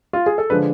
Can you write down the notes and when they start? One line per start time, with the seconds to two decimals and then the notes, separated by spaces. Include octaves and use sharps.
0.13 F4
0.26 G#4
0.38 A4
0.50 D3 F3 G#3 D4 B4